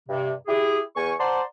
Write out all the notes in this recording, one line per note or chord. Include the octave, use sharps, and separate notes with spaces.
G2 C3
E4 G4 G#4
E2 G#5 C#6
C5 D5 F#5 A5 A#5 C6